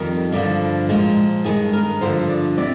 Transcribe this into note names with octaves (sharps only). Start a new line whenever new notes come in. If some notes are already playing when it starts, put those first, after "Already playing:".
Already playing: F2 D#3 G3 A#4
G2 D3 F3 D5
A#2 F3 G#3
G2 D#3 G#3 G#4
A#4
G2 D3 F3 C5
D5
C3 D5